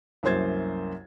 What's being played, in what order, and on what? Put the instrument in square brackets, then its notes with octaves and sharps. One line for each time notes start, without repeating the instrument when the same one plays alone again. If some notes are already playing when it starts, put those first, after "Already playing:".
[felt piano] C2 F#2 A#3 C5 G#6 A6